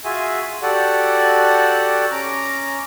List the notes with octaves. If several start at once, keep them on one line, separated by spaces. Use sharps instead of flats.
F4 F#4 G#4 E5 G#5
F#4 G4 A4 D5 F#5
C#4 A#5 D6